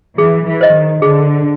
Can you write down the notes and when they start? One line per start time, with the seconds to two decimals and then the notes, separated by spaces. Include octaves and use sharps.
0.18 E3 G#4
0.47 E3
0.61 C5 D#5
0.75 D#3
1.02 D3 G#4